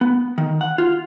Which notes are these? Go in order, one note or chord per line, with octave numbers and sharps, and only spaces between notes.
B3
D#3
F#5
F4